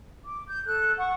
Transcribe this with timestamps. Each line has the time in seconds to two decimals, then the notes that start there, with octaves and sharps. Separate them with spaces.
0.24 D6
0.48 G6
0.65 A4 F#6
0.98 F#5 C#6